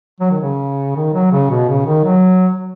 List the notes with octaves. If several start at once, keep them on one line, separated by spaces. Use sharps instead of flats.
F#3
D#3
C#3
D#3
F#3
C#3
B2
C#3
D#3
F#3